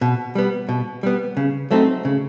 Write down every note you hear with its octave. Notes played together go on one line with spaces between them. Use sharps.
B2
G3 B3
B2
G3 B3
C#3
F#3 A3 C4 D#4
C#3